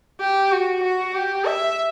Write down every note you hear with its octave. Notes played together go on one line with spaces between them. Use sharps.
G4
F#4
F#4
G4
E5